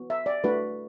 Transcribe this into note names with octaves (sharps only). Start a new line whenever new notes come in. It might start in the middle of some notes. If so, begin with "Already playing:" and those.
Already playing: B3 F#4
E5
D5
A3 D4 F#4 B4